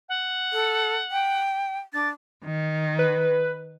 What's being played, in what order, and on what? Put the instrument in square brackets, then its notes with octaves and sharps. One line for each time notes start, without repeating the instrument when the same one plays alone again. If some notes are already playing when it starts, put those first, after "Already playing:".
[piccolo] F#5
[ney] A4
G5
[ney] D4 [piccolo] A6
[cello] D#3
[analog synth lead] B4